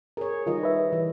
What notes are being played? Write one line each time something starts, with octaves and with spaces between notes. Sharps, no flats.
G#4 A#4 C#5
D#3 G3 F4 A#4 D#5
B4 E5
E3